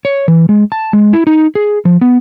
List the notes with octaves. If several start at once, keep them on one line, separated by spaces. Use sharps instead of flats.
C#5
E3
G#3
A5
G#3
E4
D#4
G#4
F3
B3